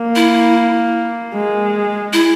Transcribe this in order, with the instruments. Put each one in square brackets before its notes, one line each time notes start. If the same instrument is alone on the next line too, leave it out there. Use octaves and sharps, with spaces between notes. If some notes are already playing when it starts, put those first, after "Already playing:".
Already playing: [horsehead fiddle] A#3
[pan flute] E4
[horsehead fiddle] G#3
[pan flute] E4